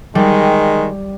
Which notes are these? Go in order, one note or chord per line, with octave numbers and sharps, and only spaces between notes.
D#3 G3 G#3